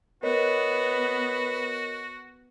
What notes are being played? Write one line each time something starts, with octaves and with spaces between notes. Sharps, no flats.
B3 F#4 A#4 B4 C#5 D#5